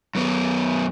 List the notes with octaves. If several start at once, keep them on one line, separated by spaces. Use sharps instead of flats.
F#2 B3